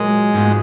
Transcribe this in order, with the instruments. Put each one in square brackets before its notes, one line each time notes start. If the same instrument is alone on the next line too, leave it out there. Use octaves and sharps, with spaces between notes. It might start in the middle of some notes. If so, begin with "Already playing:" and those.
Already playing: [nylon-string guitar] A#2 F#3 A#3 [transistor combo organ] G#3
[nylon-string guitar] G#2 F3 B3 F#4